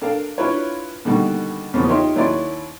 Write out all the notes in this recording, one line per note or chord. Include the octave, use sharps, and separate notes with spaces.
D4 A4 A#4 F5
C#4 D4 E4 F4 B4 C#5
B2 D3 D#3 G3 A#3 F#4
E2 C#3 F3 F#3 A#3 B3
D#4 F4 G4 C#5 E5 C6
D#2 F#3 C#4 E4 D5 C6